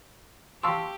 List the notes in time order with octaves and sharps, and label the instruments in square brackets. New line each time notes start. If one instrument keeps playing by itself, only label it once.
[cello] G4 [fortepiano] F5 A5 E6 [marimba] C6 C#6